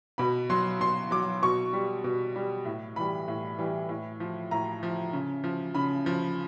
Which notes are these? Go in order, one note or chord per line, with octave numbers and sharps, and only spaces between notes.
B2 B5
F#3 C6
B2 C6
F#3 D6
B2 C#6
G3
B2
G3
A2
E3 G3 B5
A2
E3 G3
A2
F3
A2 A#5
F3
C#3
F3
C#3 B5
F3